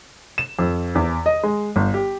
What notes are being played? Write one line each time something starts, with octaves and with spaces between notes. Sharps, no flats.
E7
F2
E2
D#5
G#3
G1
G4